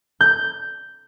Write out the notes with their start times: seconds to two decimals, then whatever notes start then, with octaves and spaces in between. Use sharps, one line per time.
0.21 G6